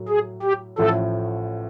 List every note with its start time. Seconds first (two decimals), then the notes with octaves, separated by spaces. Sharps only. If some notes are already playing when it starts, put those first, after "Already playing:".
Already playing: A2 F#3
0.08 G#4
0.43 G4
0.78 A1 A2 F3 A3 A4